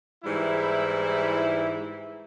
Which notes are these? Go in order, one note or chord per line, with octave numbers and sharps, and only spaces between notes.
G#2 E3 G3 E4